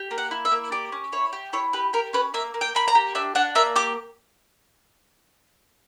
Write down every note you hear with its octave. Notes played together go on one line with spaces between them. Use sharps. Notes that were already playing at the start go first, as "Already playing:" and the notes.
Already playing: G4
A#3
F#5
E4
E5
A#3
G4 D5
C#4
E4 C#5
G4
E4 C#5
G4 B4
G4 A#4
C#4 B4
A#3 E5
A#3
G5
A#3 B5
A#5
G4
D4 E5
D4 F#5
A#3 E5
G4 D6